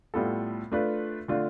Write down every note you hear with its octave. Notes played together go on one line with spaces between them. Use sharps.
A2 G3 B3 F4 A4
A3 D4 F4 B4
D3 A3 D4 F4